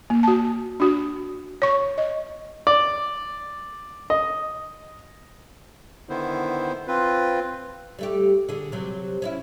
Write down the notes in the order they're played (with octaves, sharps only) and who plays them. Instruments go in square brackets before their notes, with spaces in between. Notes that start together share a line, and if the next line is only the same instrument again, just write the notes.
[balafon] A#3
F#4 A5
D4 F#4
C#5 C#6
D#5
[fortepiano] D5
D#5
[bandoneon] D3 D#3 B3 E4 C5
C4 F4 B4
[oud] G3 A3 G4
D3 G#4
C3 F#3
C#4 D#4 E4